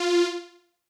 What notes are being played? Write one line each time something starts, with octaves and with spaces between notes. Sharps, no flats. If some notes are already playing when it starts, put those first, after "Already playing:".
Already playing: F4